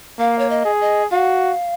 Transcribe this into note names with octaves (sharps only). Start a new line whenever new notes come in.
A#3 F5
C#5
D#5
G#4
D#5
F#4 F5